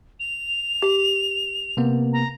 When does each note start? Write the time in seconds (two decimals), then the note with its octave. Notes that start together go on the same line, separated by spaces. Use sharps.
0.20 F7
0.82 G4
1.77 C3 A#3 B3
2.13 A#5